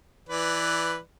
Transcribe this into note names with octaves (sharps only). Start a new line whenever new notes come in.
E3 B4 D5